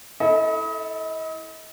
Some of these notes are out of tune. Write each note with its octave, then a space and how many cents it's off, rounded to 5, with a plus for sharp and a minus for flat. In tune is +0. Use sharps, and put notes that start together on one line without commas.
E4 -10 A4 +0 D#5 +35